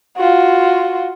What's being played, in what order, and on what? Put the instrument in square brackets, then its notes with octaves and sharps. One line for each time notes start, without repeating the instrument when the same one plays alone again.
[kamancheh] F4 F#4